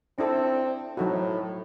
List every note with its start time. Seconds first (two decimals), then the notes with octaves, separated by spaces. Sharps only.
0.18 C4 D4 E4 A4
0.97 A2 F#3 D#4 F#4